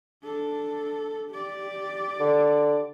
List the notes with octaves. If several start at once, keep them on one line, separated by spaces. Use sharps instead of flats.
D4 A4
G4 D5
D3